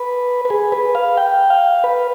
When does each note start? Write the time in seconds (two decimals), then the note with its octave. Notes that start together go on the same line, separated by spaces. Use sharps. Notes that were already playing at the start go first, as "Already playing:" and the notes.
Already playing: B4
0.45 B4
0.50 G#4
0.72 B4
0.95 F5
1.17 G5
1.50 F5
1.84 B4